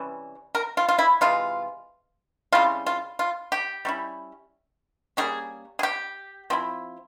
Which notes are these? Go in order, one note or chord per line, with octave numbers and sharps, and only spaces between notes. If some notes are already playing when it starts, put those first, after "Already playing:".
Already playing: C3 E3 G3 C#4
A#4
F4
F4
E4
C3 E3 G#3 F4
C#3 G3 C4 E4 F4
F4
F4
G4
G3 C#4 E4
G3 A#3 C#4 G#4
G#4
G4
F3 C4 E4